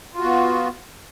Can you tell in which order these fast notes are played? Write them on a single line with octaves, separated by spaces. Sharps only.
F4 F#4 B3